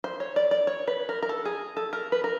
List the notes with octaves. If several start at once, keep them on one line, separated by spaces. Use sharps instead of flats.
C5
C#5
D5
D5
C#5
B4
A#4
A#4
A4
G#4
A4
A#4
B4
A#4